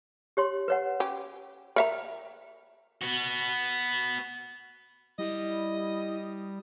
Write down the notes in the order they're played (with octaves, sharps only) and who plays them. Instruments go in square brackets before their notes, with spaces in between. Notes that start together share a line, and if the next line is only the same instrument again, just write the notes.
[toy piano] G4 C#5 C6
B4 C#5 F#5
[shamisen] C#4 G4
[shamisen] A#4 E5 A#5 [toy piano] G5
[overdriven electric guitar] B3 F#4
[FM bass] G3 [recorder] E4 [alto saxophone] D#5